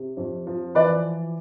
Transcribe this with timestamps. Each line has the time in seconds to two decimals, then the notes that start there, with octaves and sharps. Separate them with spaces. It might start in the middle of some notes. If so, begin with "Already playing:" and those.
Already playing: C3
0.17 F2
0.47 F3
0.75 E3 B4 D5